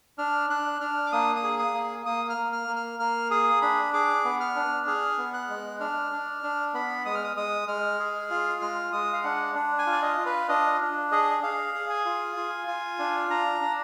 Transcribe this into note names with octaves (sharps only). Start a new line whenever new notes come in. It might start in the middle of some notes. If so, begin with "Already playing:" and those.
D4 F6
D4 F#6
D4 F6
D6
A#3 D#6
D#6
G#4
D#6
A#3
A#3 D#6
F6
A#3
F6
A#3
F6
A#3 F6
G#4 D#6
D4 B5
G#4 D6
B3
F6
D4
G#4 F6
B3
F#6
G#3
D4 F6
D4
D4
B3 B5
G#3 D#6
F6
D#6
G#3 D#6
G#3 F6
G#4
F4
G#3 F6
G#3 D#6
F5
D4 F#5
D4
G#5
F4
D5
D#5
F4
B4
D4 D#5
D4
G#4 D#5
G#4 F5
G#4
G#5
F4
F4
F4
D4
D4 A#5
D4